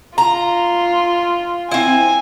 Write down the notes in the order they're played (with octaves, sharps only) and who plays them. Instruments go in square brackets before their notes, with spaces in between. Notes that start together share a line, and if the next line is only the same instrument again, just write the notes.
[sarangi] F4 [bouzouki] A#5
[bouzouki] C4 E4 [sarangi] G#5